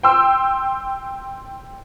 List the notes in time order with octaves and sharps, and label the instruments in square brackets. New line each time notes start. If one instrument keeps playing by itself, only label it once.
[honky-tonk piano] G5 C6 E6